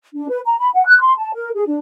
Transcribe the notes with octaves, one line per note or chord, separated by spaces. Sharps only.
D4
B4
A#5
B5
F#5
F#6
C6
A5
A#4
G#4
D4